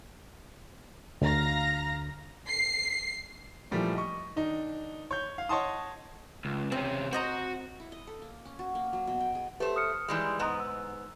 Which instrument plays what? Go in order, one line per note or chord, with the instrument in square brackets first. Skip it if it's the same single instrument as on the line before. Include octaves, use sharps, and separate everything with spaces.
[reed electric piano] D2 D3 [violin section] F5 A#5 A#6
[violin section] C7
[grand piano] A#2 E3 F3 G3 A3 A#3
D#5 C#6
D#3 D4 D#4
C#5 G6
F5
C#5 D#5 F#5 A5 C6 D#6
[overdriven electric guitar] C#2
[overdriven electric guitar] C3 C#4 [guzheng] C4
[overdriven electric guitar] F#4 [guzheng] C5 D#5 A#5
[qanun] E4
D#5
A4
A#3
C#4
F#4
A#3
F#3
B2
G5
G#4
[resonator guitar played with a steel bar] A3 C5 [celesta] G4 B4
[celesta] D#6 F6 C#7
[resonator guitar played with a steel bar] E3 G3 G#3
[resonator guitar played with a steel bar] G#2 B3 [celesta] D#5 A#5 D#6
[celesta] E6